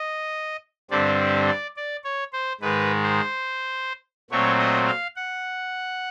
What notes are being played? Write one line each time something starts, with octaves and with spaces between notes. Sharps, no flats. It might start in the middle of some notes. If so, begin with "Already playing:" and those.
Already playing: D#5
G2 D3 G3 C4 D5
D5
D5
D5
C#5
C5
G#2 D#3 G#3 B4
C5
A#2 F#3 A3 C4 C#5
D#5
F5
F#5